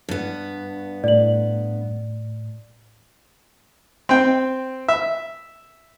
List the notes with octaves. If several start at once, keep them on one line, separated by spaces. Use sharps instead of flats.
G2 B3
A2 D5 F#7
C4 G5
E5